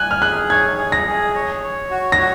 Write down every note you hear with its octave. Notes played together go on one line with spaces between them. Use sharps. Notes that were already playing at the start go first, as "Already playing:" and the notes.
Already playing: G#5 F#6
F6
G#4 F#6
C#5 G#6
G#4
A#6
G#4
C#5
C#5
F#4
A#6
F#4